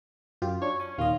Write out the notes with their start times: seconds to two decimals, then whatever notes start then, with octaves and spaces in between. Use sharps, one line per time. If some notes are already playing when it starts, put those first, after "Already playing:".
0.42 F#2 F4 G4
0.62 D4 C#5
0.80 C#4 G#5
0.98 D#2 A#2 F4 D#5